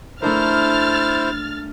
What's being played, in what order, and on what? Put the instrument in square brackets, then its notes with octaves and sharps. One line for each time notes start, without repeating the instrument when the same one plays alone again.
[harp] A3 D4 A#4 [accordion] E4 C5 [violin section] F6 A6